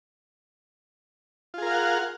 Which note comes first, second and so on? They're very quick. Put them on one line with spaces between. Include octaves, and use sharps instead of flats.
F4 G#4 A#4 F5 F#5